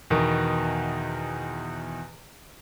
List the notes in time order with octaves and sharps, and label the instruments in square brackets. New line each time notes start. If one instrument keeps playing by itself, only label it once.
[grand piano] E2 B2 D#3